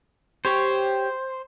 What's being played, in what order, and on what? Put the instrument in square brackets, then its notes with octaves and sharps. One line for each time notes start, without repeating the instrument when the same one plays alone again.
[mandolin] G4 C#5 [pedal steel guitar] C5